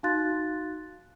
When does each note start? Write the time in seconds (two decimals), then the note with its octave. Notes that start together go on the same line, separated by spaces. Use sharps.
0.03 D#4 F#4 F5 C6 F#6 A6